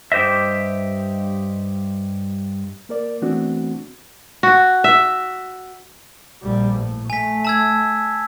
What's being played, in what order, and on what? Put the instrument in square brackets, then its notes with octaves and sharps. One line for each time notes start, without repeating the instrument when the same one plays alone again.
[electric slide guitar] G2 G4 C5 D#5 E5
[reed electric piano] A#3 A#4 D5
E3 A3 B3 C4 D4 F#4
[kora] F#4
E5
[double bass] A#1 G3
A2
[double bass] A3 [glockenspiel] G#5 B6
[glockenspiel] A5 E6 G#6